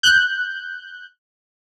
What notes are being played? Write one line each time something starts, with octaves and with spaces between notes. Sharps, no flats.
F#6 G6